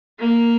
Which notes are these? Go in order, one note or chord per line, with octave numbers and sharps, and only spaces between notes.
A#3